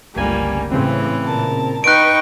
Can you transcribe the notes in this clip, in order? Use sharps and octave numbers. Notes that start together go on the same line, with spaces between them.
G1 C#2 G3 A3 A#3 G#5
A2 C#3 E3 C4
A#2 A#4 A5
D#4 B4 G5 C#6 F#6 D7